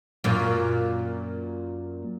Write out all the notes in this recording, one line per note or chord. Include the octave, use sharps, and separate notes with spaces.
F#2 A#2